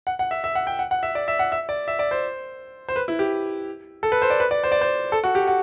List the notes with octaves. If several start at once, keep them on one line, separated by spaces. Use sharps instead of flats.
F#5
F#5
E5
E5
F#5
G5
F#5
F#5
E5
D5
E5
F#5
E5
D5
E5
D5
C5
C5
B4
E4
G4
A4
B4
C5
D5
B4
D5
C5
D5
C5
A4
F#4
G4
F#4